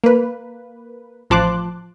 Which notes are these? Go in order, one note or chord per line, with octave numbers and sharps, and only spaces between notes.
A#3 B4
A1 F3 A5 C6 D6 F#6